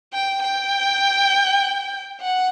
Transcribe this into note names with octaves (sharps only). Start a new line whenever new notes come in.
G5
G5
F#5